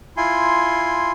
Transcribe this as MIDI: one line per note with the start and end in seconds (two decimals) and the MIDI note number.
0.17 1.12 64
0.17 1.12 65
0.17 1.12 80
0.17 1.12 84